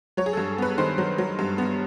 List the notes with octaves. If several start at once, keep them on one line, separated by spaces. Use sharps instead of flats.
F#3 C#5
G#4
G2 A4
B3 B4
D#3 C5
F#3
F#3
G2
B3